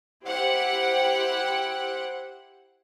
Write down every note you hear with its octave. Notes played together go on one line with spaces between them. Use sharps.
E4 G4 C5 F#5 G5